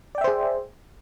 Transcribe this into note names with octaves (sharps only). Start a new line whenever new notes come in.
G#4 C5 D5 E5 G5